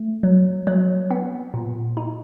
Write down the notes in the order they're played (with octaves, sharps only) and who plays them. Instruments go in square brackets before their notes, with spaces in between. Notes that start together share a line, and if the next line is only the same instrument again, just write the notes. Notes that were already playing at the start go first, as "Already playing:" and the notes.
Already playing: [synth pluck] A3
F#3
F#3
B3
A#2
D#4